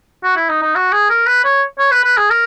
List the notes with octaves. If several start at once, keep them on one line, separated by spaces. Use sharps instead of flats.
F#4
E4
D#4
D#4
F#4
G#4
A#4
B4
C#5
C#5
B4
B4
G#4
A#4